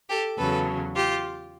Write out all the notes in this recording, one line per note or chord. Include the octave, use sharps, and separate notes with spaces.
G4 A4
E2 C#3 F#3 A4 B4
F4 G4